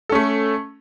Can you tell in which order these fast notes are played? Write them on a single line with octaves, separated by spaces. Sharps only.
A4 C#4 A3